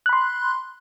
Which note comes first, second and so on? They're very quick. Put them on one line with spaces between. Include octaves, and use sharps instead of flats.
F#6 B5 C6